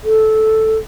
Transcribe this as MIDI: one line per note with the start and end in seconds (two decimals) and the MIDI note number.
0.04 0.77 69